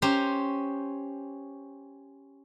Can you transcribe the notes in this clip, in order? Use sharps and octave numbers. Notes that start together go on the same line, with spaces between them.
C#4 G4 C5 A#5